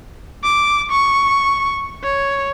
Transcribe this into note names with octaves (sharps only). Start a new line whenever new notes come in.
D6
C#6
C#5